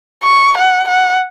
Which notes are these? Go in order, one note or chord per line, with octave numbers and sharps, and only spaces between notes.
C#6
F#5
F#5